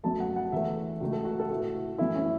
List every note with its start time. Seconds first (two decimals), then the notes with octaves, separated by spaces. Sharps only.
0.03 F#2 F#3 A3 A5
0.20 F#5
0.36 F#5
0.52 E2 E3 A3 E5
1.00 C#2 C#3 A3 F#4
1.13 A4
1.25 F#4
1.39 A4
1.50 A2 A3 F#4
1.98 F#2 E3 A3 E4
2.15 C#4